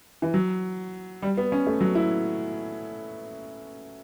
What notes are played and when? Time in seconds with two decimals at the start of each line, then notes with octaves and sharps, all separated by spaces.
0.22 E3
0.34 F#3
1.22 G3
1.37 B3
1.52 C#4
1.67 A3
1.81 F#3
1.95 E4